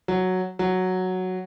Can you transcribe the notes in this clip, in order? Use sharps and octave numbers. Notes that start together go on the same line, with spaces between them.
F#3
F#3